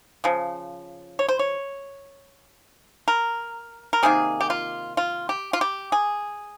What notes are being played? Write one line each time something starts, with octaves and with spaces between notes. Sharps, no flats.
C#3 F3
C#5
C5
C#5
A#4
A#4
C3 D#3 A#3 G#4
G4
F4
F4
G4
F4
G4
G#4